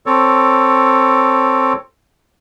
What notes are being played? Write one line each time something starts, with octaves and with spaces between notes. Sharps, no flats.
C4 A4 C#5